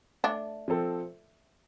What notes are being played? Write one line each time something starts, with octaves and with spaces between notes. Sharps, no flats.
A3 D4
F3 C4 A4